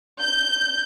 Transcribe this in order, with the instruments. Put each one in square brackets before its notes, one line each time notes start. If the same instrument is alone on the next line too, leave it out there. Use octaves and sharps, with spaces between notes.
[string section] G6